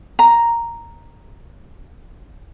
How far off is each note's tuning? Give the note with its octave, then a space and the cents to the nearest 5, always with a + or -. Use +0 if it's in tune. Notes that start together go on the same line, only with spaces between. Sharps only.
A#5 +0